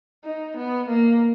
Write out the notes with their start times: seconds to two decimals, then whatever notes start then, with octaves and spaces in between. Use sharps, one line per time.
0.24 D#4
0.57 B3
0.89 A#3